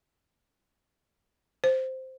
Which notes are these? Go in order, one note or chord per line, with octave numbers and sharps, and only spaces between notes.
C5